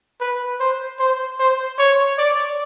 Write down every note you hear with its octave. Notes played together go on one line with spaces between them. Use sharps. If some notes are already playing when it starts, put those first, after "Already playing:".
B4
C5
C5
C5
C#5
D5